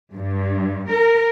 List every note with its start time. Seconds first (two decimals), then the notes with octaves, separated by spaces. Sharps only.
0.14 G2
0.90 A#4